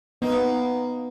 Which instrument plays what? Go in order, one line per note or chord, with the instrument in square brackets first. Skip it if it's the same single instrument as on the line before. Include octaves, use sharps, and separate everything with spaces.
[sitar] A#3 D#4 [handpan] B3